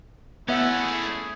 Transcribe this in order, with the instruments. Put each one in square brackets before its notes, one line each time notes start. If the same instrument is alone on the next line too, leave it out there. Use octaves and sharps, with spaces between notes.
[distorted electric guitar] A3 C#4 [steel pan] B3 E5 [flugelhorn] E4 [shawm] F#5
[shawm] G#4